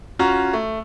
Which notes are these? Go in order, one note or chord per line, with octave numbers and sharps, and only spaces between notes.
C#4 F4 F#4 A#5
A3